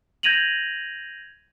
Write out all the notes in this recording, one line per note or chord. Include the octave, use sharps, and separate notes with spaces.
G6 G#6 A#6 D#7 F7 F#7